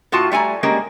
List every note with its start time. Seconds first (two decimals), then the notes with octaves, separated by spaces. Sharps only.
0.12 A2 F4 F#4 A5
0.32 G3 A3 G#5 A#5
0.63 G3 G#3 A#3 C#4